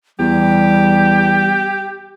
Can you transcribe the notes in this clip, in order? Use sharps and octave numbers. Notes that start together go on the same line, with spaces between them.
E2 G3 G4